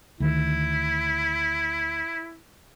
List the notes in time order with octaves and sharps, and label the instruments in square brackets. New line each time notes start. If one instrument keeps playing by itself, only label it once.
[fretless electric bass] D2 D#3 [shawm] E4